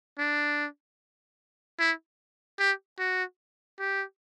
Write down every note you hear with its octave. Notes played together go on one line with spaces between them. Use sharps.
D4
E4
G4
F#4
G4